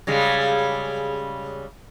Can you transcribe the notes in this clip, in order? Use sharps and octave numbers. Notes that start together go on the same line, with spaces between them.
C#3 G3 G#3